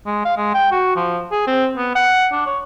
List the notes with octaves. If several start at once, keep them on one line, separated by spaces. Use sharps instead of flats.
G#3
F5
G#3
G5
F#4
F3
G#4
C4
B3
F#5
D4
C#5